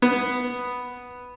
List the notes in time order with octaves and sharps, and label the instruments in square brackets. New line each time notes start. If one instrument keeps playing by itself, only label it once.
[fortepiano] B3